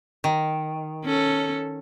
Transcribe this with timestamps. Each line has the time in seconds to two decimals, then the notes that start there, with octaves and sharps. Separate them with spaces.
0.24 D#3
1.05 C#4 A4